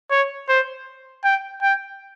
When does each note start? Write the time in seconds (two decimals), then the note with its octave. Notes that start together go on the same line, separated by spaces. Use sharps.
0.10 C#5
0.49 C5
1.24 G5
1.62 G5